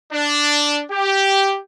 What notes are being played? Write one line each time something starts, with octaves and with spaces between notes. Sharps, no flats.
D4
G4